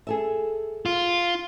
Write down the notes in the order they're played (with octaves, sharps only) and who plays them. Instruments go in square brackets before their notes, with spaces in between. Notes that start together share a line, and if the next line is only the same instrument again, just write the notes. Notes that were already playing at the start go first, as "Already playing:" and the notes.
[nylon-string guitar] G#4 A4 E5
[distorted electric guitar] F4